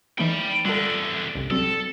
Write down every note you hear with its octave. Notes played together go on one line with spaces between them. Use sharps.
E3 A3 D#4 G5 B5
E2 D3 G3 F4 A4
C2 G2 C3
F#3 G3 C4 A4